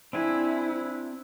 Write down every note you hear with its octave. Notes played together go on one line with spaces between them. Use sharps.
C4 D4 E4 G#5